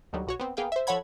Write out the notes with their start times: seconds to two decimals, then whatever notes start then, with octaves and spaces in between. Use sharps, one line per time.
0.13 D2 D3 D#3 F#3 G3
0.27 B1 F#4 C#5
0.40 B3 C4
0.57 A#3 B3 G#4 F5 G5
0.72 C5 E5
0.87 F3 A4 C#5 F#5 B5 G#6